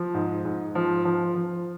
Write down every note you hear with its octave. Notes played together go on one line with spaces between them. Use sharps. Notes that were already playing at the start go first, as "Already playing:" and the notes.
Already playing: F3
G#2
G#2
F3
F3
F3